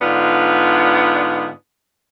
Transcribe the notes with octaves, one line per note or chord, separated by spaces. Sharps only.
G#2 D3 B3 D4 F4